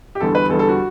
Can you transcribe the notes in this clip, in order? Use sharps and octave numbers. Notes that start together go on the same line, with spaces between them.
G4
E2 D3 G3 A4
B4
E2 D3 G3 A4
A4
F#4